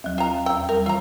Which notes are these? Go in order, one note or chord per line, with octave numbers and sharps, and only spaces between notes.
D#2 F#3
F4 G5 A#5
E2 G5 E6
G3 A#4
E3 F4 A#5